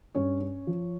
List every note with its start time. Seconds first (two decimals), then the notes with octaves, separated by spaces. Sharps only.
0.15 G2 C#4 C#5
0.41 C#4
0.67 F3